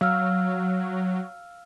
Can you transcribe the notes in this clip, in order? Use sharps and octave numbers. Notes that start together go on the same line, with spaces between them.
F#3 F5 E6 F6